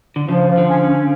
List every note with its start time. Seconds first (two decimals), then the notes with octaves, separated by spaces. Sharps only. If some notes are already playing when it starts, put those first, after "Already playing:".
0.16 D3
0.28 C#3 F3
0.48 F3
0.58 D3
0.68 C#4
0.88 C#4